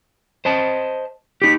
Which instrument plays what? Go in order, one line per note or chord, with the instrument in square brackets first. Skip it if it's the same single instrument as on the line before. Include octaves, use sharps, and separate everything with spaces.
[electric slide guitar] C5 D#5 A5
[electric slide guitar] D#4 G4 [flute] B6